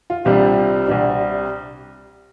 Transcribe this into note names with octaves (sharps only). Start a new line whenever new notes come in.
F4
C2 C3 G3 D4 F4
C2 C3 G3 D4